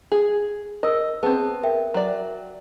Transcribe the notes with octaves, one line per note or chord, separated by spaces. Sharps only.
G#4
A#4 D#5 E6
B3 C4 G#4 A5
A#4 E5 G5
F#3 D5